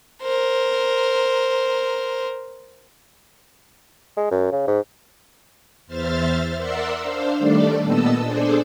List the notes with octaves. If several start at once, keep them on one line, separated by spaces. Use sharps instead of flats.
A#4 C5
G#3
F#2
C#3
G#2
E2 C5 E5 F6 A6
A#4 D5 E5 F#5 C6 E6
D4 C5 F5
D#3 G3 A3 D4 A4 D5
A#2 B3 D#5 A5 E6
D4 G#4 A4 C5 D5